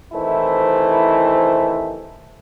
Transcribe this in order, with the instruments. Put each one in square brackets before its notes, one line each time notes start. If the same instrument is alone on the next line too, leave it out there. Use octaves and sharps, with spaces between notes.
[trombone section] C3 D#3 E3 A3 E4 C5